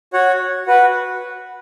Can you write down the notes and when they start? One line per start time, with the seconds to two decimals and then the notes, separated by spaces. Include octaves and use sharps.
0.13 F#4 C#5 F#5
0.67 F#4 B4 F#5